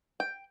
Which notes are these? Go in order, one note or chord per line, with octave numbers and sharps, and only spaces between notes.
G5